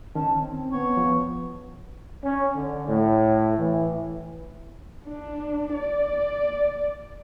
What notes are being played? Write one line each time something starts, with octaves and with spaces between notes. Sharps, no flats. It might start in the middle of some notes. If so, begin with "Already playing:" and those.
D#3 C#4 A5
C4
B3 C#5
E2 F3
C#4
D3
A2
E3
D4
D5